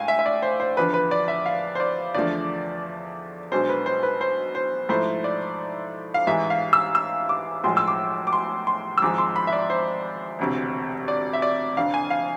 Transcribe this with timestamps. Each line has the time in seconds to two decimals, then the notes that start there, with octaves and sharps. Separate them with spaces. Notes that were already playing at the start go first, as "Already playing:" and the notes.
Already playing: A2 G#3 F5 G#5
0.08 E5
0.19 E5
0.26 D5
0.42 C5
0.60 C5
0.77 E2 D3 F3 B4
0.94 B4
1.11 D5
1.28 E5
1.46 F5
1.75 C5
1.80 D5
2.15 E2 D3 F3 A3 D5
3.52 B1 B2 G#3 D4 C5
3.69 B4
3.86 C5
4.03 B4
4.21 C5
4.55 C5
4.89 G#2 F3 A3 E4 C5
5.24 D5
6.14 F5
6.27 A1 G#2 E3 G#3 E5
6.50 F5
6.73 E6
6.95 E6
7.29 D6
7.64 B1 A2 F3 G#3 C6
7.77 E6
7.88 D6
8.27 D6
8.33 C6
8.67 C6
8.98 E6
9.02 G#1 G#2 F3 G#3 D6
9.18 C6
9.36 B5
9.47 E5
9.53 D5
9.70 C5
10.39 E1 D2 C3
11.08 D5
11.33 E5
11.42 D5
11.77 F1 F2 D3 F5
11.94 G#5
12.10 F5